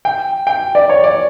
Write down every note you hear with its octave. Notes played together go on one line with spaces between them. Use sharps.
G5
G5
D5
C#5
D5